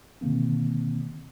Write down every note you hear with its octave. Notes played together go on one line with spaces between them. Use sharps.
B2 D3 D#3 A#3 C4